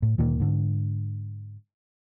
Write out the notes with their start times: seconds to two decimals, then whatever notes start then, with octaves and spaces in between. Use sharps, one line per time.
0.02 A2
0.18 D2 A#2 D#3 A#3
0.40 G#2 D3